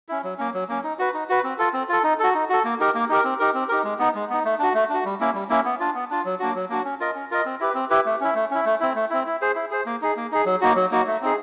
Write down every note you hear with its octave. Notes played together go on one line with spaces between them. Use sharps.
C#4 E4
F#3
A#3 C#4
F#3
A#3 C#4
D#4
F#4 B4
D#4
F#4 B4
C4
F4 A4
C4
F4 A4
D#4
F#4 A4
D#4
F#4 A4
A#3
D#4 G4 A#4
A#3
D#4 G4 A#4
C4
D#4 G4 A#4
C4
D#4 G4 A#4
G#3
B3 D#4
G#3
B3 D#4
A3
D4 F#4
A3
D4 F#4
G3
A#3 C#4 E4
G3
A#3 C#4 E4
B3
D4 F4
B3
D4 F4
F#3
A#3 D4 F#4
F#3
A#3 D4 F#4
C#4
F4 A#4 D#5
C#4
F4 A#4 D#5
C4
E4 G4 B4
C4
E4 G4 B4
A3
C#4 E4
A3
C#4 E4
A3
C4 E4
A3
C4 E4
E4
G#4 C5
E4
G#4 C5
A#3
D#4 G#4
A#3
D#4 G#4
F#3
A#3 D#4 F#4
F#3
A#3 D#4 F#4
A3
C4 D#4 G#4